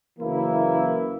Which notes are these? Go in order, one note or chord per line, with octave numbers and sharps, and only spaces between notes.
F#1 E3 A#3 E4